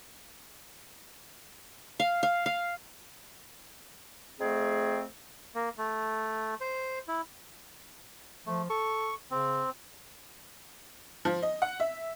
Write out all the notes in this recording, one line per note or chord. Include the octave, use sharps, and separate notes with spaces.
F5
F5
F5
F2 A3 C4 G#4
A#3
A3
C5
E4
F3 A3
A4 C#6
C#3 C4
F3
D#5
F#5
E5